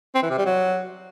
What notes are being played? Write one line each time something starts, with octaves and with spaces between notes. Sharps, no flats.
C4
E3
C3
G3
F#3